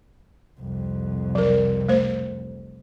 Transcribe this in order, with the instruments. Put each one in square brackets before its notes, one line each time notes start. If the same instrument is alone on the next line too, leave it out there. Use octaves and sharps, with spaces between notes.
[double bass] C2 F2
[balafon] F#3 A#4
A3 C5